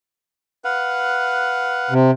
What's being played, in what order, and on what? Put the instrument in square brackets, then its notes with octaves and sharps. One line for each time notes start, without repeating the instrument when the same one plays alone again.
[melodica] B4 F5 F#5
[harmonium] C3